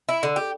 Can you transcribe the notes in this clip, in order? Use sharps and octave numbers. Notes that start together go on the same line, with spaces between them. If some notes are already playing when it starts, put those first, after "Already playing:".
E4
D3
G4